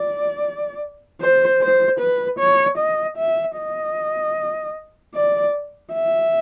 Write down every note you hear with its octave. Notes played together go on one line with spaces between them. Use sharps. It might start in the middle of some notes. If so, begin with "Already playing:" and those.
Already playing: D5
C5
C5
B4
C#5
D#5
E5
D#5
D5
E5